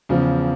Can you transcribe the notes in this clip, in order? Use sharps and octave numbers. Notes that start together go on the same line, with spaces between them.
E2 C#3 F3